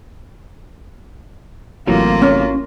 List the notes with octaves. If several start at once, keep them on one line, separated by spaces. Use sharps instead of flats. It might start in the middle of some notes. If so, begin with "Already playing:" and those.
G#1 C3 E3 F#3 A3 A#3 F4
C#4